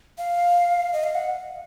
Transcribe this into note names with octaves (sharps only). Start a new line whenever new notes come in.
F5
D#5
F5
F#5